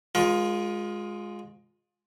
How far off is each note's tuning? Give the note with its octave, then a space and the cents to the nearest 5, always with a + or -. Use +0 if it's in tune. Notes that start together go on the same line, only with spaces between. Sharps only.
G#3 +0 F4 +25 A#4 +30